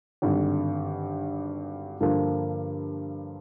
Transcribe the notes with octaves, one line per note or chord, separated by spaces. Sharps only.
G#1 G2 D3
G2 D3 F3 A#3